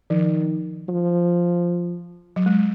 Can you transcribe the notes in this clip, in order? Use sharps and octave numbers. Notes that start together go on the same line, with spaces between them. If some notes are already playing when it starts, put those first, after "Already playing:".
D#3 F3
F3
F#3
G#3